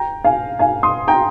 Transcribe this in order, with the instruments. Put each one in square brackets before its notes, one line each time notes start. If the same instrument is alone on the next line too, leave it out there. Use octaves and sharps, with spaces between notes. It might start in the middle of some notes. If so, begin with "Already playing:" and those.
Already playing: [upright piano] G5 A#5
F5 G#5
F5 G#5
C6 D#6
G5 A#5